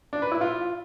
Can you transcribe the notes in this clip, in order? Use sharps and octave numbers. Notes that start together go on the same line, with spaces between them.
D4
B4
E4
F4